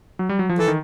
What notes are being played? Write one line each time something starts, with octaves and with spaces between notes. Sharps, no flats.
F#3
G3
F#3
F3
E3 A4
D#3